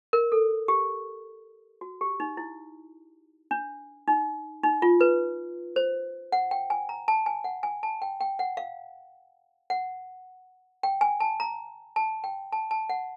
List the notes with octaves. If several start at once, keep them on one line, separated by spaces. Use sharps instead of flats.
A#4
A4
G4
F#4
G4
D#4
E4
D4
D#4
D#4
F4
B4
C5
F#5
G5
G#5
A#5
A5
G#5
F#5
G#5
A5
G5
G5
F#5
F5
F#5
G5
G#5
A5
A#5
A5
G5
A5
A5
F#5